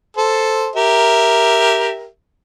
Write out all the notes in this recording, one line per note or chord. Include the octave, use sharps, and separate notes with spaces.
A4 C5
G4 A#4 E5